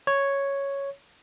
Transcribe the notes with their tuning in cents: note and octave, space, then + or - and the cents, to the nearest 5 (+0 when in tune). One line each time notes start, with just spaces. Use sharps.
C#5 +0